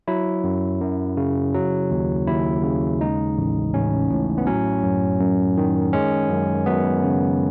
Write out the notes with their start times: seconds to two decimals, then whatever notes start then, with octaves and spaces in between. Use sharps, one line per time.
0.08 F#3 E4
0.44 F#2
0.81 F#2
1.17 C#3
1.54 F#3
1.91 D#2
2.27 D#2 E4
2.64 C#3
3.01 G#3 D#4
3.38 A1
3.74 A1 C#4
4.10 A2
4.38 B3
4.47 F#3 C#4
4.83 F#2
5.20 F#2
5.57 D#3
5.93 G#3 C#4
6.30 F#2
6.66 F#2 B3
7.04 C#3